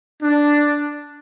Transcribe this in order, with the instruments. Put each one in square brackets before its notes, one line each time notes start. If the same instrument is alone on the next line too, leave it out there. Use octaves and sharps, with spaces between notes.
[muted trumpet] D4